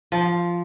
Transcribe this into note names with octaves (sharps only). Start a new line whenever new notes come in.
F3